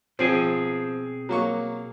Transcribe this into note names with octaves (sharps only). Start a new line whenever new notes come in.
B2 F3 C4 G#4
F#3 A#3 C#6